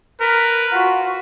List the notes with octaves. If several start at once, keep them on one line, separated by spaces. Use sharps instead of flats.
A#4 B4
F4 F#4